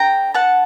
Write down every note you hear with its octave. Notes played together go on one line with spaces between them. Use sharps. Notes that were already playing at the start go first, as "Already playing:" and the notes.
Already playing: D4 A4 G5 A#5
F#5 A5